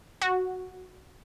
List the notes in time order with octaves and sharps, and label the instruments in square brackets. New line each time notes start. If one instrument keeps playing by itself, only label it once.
[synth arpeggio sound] F#4